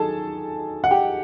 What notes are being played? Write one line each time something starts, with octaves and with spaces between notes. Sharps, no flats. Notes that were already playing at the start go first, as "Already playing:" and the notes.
Already playing: D#3 F#3 G#4 A4 A5
F#5
G4 G5